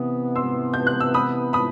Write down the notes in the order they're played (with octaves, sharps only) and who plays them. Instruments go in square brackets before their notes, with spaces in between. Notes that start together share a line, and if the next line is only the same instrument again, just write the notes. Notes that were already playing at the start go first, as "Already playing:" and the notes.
Already playing: [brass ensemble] C3 E3 B3 [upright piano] D#6
[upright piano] C6 E6
G6
F#6
E6
B5 D#6
B5 D#6